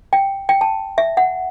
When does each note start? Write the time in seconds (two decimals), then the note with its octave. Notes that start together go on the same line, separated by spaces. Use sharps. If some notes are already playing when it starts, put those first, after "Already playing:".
0.13 G5
0.49 G5
0.61 A5
0.98 E5
1.17 F#5